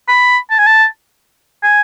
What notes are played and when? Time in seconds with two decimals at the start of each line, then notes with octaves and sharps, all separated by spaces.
0.08 B5
0.50 A5
0.59 G#5
0.67 A5
1.63 G#5